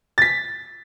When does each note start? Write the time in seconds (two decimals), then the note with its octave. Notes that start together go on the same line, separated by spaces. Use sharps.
0.18 A6 B6